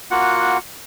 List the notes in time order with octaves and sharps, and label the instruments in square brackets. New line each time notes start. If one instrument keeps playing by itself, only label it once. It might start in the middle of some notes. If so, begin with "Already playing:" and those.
[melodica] A#3 F4 F#4 F#5